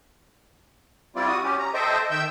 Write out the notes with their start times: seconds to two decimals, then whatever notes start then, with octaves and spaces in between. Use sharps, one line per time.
1.16 G3 C4 E4 F4 D5
1.28 F#4 D#6
1.44 C#4 G4
1.59 A#5
1.74 A4 C5 D#5 E5 G5
2.11 D#3 E5 G5 E6 G6